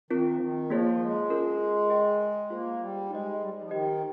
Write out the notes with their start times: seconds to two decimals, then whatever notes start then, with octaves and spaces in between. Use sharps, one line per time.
0.11 D#3 C4 F4 A#4
0.34 F3
0.40 D#3
0.70 F3 A#3 F4 G#4 C#5
1.01 G#3
1.30 C#4 F4 A#4
1.90 G#4 D#5 G5
2.50 A#3 F4 G#4 C5
2.80 G3
3.10 G#3 D#4 G4 C5 D#5
3.40 G3
3.54 G3
3.62 F3
3.70 D#3 G4 C5 D#5